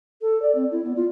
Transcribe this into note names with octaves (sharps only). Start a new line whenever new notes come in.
A4
D5
C4
E4
B3
F4